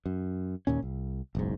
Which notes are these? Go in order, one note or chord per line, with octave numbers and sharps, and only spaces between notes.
F#2
D#2 A#2 C#4
C2
F#1 B1 G#2